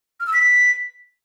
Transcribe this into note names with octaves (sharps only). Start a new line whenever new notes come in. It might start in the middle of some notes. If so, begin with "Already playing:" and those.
F6
E6
B6